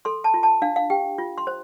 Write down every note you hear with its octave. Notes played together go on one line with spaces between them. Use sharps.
A4 C6
A5
F4
A5
D4 F5
F5
G4 G5
F4
C6
C5